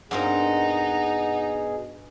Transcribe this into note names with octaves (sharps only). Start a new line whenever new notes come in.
G2 B2 C4 D#4 G#4 A#4 F#5